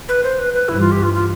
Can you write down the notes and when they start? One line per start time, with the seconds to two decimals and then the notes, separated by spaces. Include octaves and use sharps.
0.09 B4
0.24 C5
0.39 B4
0.54 B4
0.68 G2 E3 G3 E4
0.80 F4
0.92 G4
1.03 F4
1.14 F4